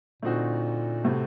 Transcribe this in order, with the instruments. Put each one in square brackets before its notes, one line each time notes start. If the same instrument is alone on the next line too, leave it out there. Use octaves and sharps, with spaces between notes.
[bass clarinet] A#2 [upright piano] D3 A3 C4 D#4 F#4
[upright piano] A2 A3 C4 F#4 [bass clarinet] C3